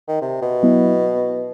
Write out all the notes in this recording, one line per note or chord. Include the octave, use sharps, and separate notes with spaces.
D#3
C3
B2
F#3 B3 E4